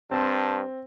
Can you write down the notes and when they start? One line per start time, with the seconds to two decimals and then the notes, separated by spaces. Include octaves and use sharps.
0.11 G2 C4 A#4 C5 A5